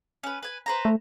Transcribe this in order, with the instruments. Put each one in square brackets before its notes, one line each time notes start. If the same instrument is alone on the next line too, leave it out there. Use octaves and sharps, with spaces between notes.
[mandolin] C#4 B4
B4 G#5
B4 C5 A#5
[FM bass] A3